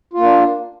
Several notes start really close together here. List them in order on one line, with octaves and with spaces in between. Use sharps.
F4 A#3 D4